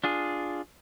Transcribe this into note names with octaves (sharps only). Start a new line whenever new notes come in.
D4 F4 G#4